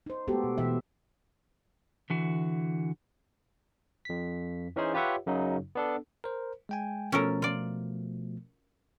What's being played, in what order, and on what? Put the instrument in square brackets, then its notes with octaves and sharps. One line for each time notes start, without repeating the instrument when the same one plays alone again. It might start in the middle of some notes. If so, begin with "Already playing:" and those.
[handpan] D#4 C5
G#3 A3 B3 F#4 G4 A4
B2
B2 E3 E5
[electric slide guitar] D3 E3 F#4
[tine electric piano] F2 B6
E3 C#4 D#4 G#4 C5
F4 G4 B4 C#5 E5 F#5
F#2 C#3 F#3 D#4
B3 D4 A4
A#4 C5
G#3 G5 G#5
[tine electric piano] B2 F3 A3 [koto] C#4 A4 A#4
[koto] F4 D5